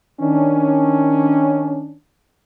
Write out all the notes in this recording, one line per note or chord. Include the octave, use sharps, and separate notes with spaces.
D#3 C#4 D4